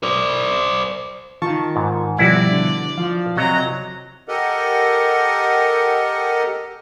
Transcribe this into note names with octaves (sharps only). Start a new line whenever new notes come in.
C5 D5
D#3 F4 A5 C#6
G#2
B2 F3 G3 E4 F#4 D5
D3
F3 F5
C3 F#3 F#4 D#5 A#5
G4 A4 A#4 D#5 F#5